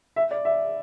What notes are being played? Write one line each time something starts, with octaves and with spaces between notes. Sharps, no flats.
E5
D5
E5